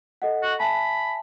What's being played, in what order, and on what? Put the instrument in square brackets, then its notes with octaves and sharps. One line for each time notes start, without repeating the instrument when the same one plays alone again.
[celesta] A4 D#5 F#5
[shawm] F#4
[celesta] E5 G#5 A5 [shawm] B5